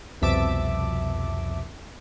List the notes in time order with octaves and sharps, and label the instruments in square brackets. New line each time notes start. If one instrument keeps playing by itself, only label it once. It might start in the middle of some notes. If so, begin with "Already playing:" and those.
[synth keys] C2 F2 B2 E5 A5 D6